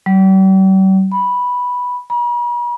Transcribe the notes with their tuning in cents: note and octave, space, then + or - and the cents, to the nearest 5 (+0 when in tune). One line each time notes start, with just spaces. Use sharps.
G3 -45
B5 -5
B5 -45